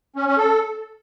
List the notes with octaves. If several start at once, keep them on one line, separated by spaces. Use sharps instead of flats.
C#4
C#4
A4